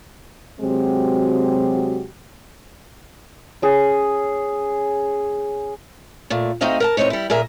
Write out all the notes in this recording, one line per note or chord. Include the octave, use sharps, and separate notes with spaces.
C3 F#3 G#3 C4 F#4 G4
C#4 G#4
A#2 A3
A3 C4 D#4 F#4 D#5 F5
A#4 F#5 A5
E2 A2 C4 D#4 C#5
G3 E4
A#2 G#4 A#4 E5